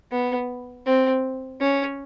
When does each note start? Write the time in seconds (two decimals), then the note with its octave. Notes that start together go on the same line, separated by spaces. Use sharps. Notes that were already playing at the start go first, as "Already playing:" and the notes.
0.11 B3
0.86 C4
1.60 C#4